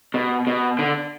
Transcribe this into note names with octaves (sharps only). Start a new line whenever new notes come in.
B2
B2
D3